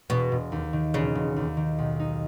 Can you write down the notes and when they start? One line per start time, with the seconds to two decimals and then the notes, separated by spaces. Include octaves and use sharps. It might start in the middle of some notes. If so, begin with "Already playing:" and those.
0.09 E1 B2
0.32 E1
0.52 D#2
0.73 D#3
0.94 E1 C#3
1.15 E1
1.36 D#2
1.57 D#3
1.78 B1
1.99 D#4